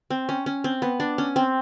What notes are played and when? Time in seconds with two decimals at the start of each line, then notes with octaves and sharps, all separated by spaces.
0.10 C4
0.29 C#4
0.46 C#4
0.64 C4
0.82 B3
1.00 D4
1.18 C#4
1.36 C4